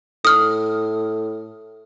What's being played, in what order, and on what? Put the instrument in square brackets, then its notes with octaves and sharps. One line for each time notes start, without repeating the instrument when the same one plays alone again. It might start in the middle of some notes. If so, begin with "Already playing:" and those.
[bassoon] A2 [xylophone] D#6 F6